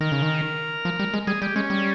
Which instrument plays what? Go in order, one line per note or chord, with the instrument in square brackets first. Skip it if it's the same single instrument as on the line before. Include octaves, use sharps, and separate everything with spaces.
[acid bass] D#3 [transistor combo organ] A#4
[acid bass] C#3
D#3
F3
G3
G#3
[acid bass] G3 [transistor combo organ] G#4
[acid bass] G3 [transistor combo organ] G4
[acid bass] G#3 [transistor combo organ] C#4
[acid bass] G3